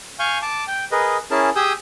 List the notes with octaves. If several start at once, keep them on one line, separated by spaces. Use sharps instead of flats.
F5 G#5 C#6 F6 G6
A5 D6
G5
G#4 A#4 B4 D#5
C#4 E4 G#4 A#4 A5
G4 G#4 G#5 D#6 E6 G6